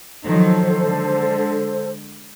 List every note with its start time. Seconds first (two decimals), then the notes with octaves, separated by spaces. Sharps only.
0.25 D#3 F3 F#3 A4 C5
0.82 D3 G#3